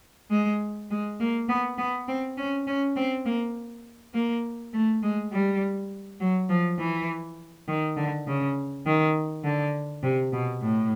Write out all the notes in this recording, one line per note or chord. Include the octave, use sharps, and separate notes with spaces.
G#3
G#3
A#3
B3
B3
C4
C#4
C#4
C4
A#3
A#3
A3
G#3
G3
F#3
F3
E3
D#3
D3
C#3
D#3
D3
C3
B2
A2